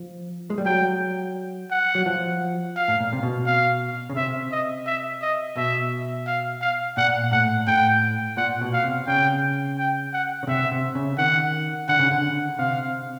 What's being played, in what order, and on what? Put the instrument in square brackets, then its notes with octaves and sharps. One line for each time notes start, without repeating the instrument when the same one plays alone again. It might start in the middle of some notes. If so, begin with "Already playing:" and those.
Already playing: [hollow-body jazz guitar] F3
G#3
G3
[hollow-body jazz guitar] F#3 [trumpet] G5
[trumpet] F#5
[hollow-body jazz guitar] F#3
F3
[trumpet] F5
[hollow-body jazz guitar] A2
A#2
C3
B2
[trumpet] F5
[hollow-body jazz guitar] C#3
[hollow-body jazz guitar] C3 [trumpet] E5
[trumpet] D#5
E5
D#5
[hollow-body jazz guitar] B2 [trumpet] E5
[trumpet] F5
F5
[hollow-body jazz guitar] A#2 [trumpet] F#5
[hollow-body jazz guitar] A2 [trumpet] F#5
[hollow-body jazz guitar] A2 [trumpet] G5
[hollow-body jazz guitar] A#2 [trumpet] F#5
[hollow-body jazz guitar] B2
[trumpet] F5
[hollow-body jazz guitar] C3
[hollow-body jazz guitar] C#3 [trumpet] G5
[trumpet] G5
F#5
[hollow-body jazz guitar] C#3
[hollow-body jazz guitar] C3 [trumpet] E5
[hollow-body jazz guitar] C3
C#3
[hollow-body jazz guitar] D#3 [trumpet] F#5
[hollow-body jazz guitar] D3 [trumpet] F#5
[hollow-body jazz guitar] C#3
D3
[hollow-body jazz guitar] C3 [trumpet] F5